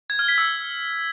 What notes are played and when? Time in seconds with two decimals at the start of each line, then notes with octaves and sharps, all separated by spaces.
0.10 G#6
0.19 F6
0.28 B6
0.38 E6